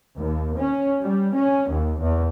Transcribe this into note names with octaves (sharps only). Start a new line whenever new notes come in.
D#2
C#4
G3
C#4
D#2
E2